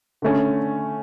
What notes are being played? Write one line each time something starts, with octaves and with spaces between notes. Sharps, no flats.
D3 A3 C#4